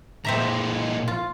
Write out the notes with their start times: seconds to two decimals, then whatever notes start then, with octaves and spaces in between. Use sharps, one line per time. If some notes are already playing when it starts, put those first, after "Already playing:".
0.25 A#2 G#3 C4 E5 A#5
1.08 F4